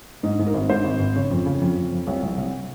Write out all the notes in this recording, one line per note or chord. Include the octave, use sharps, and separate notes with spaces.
G#2 D#5
G#2
A#4
G#1
G#2 C5
G#1
G#1
C#3 C#5
F2
C#3
F2
F2
F2
C2 C#5
C2
C2